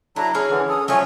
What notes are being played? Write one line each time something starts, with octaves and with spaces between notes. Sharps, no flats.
F#3 A3 D4 E4 A#5
C#4 E4 G#4 C#5 F6
D3 E3
A4 D#6
F3 F#3 A3 C#4 C#5 G#5